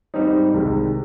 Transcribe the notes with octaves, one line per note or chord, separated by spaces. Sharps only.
G#2 G3 C4 D#4
C2 C3 D#3 G#3